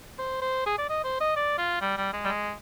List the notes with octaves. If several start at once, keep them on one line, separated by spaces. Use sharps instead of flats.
C5
C5
G#4
D5
D#5
C5
D#5
D5
F4
G3
G3
G#3
G3
G#3